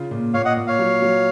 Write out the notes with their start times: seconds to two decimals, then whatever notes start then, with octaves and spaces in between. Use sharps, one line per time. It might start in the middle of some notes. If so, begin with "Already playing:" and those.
Already playing: C#3 F4
0.11 A#2
0.34 A#2 C#5 F5
0.45 D#5 F#5
0.57 A#2
0.67 C#5 F5
0.79 F#3
1.02 F#3